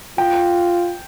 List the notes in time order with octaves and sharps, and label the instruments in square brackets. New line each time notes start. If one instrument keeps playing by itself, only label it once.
[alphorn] F4 [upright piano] G5